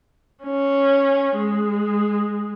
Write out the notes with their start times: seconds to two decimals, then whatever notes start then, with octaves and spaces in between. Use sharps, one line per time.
0.44 C#4
1.37 G#3